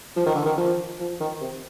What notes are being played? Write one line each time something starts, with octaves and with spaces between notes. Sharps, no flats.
F3
D#3
D3
D#3
F3
F3
D#3
C3